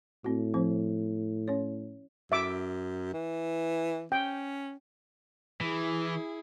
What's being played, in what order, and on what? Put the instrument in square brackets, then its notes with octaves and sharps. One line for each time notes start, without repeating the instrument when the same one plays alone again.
[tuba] A2 [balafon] C4 F#4
[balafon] F3 C4 C5
C#4 E4 C#5
[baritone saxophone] F#2 [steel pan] E5 D6
[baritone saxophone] E3
[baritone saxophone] C#4 [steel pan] G5
[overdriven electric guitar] E3 [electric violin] E4 G#4